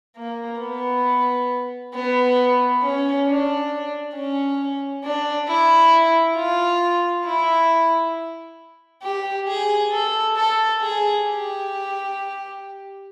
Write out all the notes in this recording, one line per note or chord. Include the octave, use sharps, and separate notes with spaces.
A#3
B3
B3
C#4
D4
C#4
D4
E4
F4
E4
G4
G#4
A4
A4
G#4
G4